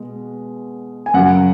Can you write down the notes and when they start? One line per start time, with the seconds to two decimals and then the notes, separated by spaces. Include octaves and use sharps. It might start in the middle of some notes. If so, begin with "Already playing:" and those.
Already playing: B2 G#3
1.06 G#5
1.14 F#2 C#3 F#3 F#5